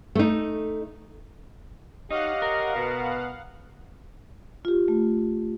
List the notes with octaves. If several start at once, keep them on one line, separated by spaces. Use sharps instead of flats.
A3 D#4
D#4 G4 C#5 D#5 F5 F#5
A#4
B2 B3
F4 G4
A3